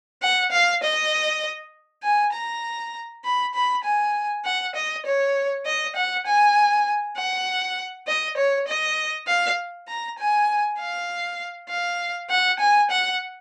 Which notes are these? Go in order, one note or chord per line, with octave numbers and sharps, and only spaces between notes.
F#5
F5
D#5
G#5
A#5
B5
B5
G#5
F#5
D#5
C#5
D#5
F#5
G#5
F#5
D#5
C#5
D#5
F5
A#5
G#5
F5
F5
F#5
G#5
F#5